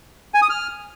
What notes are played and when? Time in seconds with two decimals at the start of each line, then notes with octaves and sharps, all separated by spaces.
0.34 G#5
0.42 D#6
0.50 F6